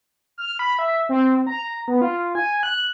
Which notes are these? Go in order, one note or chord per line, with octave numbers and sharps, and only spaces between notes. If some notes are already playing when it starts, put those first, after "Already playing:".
F6
B5
E5
C4
A#5
B3
F4
G#5
F#6